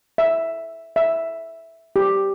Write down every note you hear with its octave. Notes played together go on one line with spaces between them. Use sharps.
E5
E5
G4